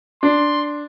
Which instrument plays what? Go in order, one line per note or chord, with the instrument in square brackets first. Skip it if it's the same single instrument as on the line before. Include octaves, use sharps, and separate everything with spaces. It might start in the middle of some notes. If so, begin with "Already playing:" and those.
[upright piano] D4 [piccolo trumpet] C6